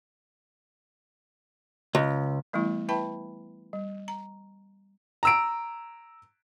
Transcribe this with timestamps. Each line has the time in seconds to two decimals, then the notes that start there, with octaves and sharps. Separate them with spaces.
1.95 C#2
2.53 E3 G3 A3 B3 E4
2.89 E4 B4 E5 G5 A5 B5
3.73 G3
4.08 A#5
5.23 A#5 E6 D7